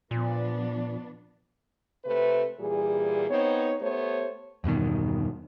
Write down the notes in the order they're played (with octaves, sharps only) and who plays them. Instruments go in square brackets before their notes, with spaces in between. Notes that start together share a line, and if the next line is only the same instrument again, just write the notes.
[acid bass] A#2 [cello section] F3 B3 D4
[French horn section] C3 A3 C4 B4
A#2 E3 G3 G#4
B3 C4 D#4 C#5
A3 B3 G4 C5 C#5
[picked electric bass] E2 G2 B2 D#3